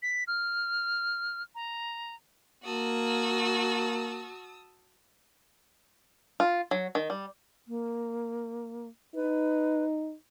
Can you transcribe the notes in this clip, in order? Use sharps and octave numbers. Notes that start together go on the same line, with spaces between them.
B6
F6
A#5
A#3 F#4 A5 D#6 E6
F4
F#3
D#3
G3
A#3
D#4 B4